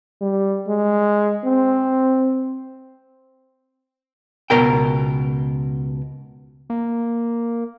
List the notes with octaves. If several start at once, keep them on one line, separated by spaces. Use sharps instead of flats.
G3
G#3
C4
C#2 B2 A#4 G5
A#3